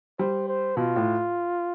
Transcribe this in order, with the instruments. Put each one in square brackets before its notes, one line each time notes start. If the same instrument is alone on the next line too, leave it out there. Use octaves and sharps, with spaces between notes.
[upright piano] G3 [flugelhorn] C5
[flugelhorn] C5
[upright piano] B2 [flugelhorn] F4
[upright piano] A2